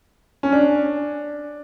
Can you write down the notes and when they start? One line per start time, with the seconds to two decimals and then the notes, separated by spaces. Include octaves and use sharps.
0.43 C#4
0.52 D4